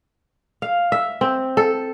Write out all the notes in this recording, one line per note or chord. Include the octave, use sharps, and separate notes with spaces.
F5
E5
C4
A4